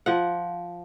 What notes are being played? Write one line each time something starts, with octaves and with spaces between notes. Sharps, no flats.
F3 F#5